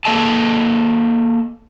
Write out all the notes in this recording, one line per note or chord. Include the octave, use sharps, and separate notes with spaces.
A#3 A4 D#5 A5